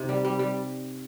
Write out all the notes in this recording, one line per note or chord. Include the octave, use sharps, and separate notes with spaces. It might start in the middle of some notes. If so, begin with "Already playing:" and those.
Already playing: C3 C4 D#4
G3
G3
G3